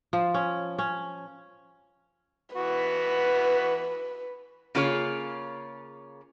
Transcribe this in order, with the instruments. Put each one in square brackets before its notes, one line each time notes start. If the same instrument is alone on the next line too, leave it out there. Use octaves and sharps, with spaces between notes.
[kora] F3
C#4
C#4
[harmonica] E3 B3 F#4 [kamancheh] B4
[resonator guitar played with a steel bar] C#3 A#3 F4 G#4 C#5